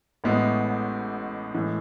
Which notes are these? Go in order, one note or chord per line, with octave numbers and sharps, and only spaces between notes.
A1 A2 G#3 B3
A2 E3 G#3